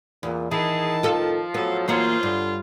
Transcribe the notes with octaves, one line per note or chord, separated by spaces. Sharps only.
E2 A#2
D#3 E3 D#4 E4 G#4 A5
F3 F4 A4
F#3 B3 A4
E2 E3 A#3 F4 G#4 C5 C#5
G2 D3